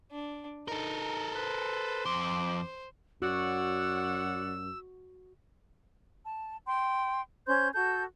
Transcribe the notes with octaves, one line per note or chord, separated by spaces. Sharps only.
D4
D#4 A4 A#4
B4 C5
F2 C6 D6
F#2 F#4 C#5 D5 F#5 E6
A5
G5 C6
C#4 C5 C6 G6
F#4 A4 G6